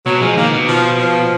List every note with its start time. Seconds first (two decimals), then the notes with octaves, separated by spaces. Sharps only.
0.06 B2 F#3
0.21 F3 G#3
0.37 D#3 A#3
0.52 B2
0.68 F3
0.99 F3